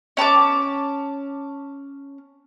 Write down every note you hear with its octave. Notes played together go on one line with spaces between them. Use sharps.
C#4 A5 B5 D6